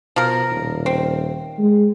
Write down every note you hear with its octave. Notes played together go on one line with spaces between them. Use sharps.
B2 F3 A#4
D#1
C4
G#3